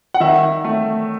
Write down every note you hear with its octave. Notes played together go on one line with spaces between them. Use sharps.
F#5
D#3 E5
A3